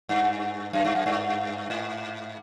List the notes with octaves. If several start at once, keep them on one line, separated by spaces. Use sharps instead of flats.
G2
F#2
G2
F#2
G2
G#2